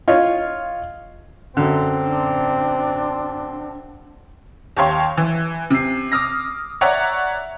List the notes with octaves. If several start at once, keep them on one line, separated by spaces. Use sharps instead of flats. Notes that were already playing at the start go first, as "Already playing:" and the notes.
F4 C#5 D#5
F#2 D3 C4
D4
D#2 G4 C#5 F5 C6 C#6
E3
C3 C7
D6 D#6 F6 A#6
C#5 D5 E5 F#5 A#5